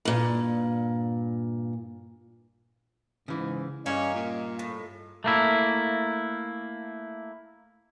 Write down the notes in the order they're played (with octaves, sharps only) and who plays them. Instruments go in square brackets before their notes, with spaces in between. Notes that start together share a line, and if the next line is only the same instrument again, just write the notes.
[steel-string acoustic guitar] G2 A#2
[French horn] G#2 [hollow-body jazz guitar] C#3 E3
[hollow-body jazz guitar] G2 [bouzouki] A#3 [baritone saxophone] C#4 [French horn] D#5
[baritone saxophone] A#2
[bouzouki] A2
[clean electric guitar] A3 A#3 E4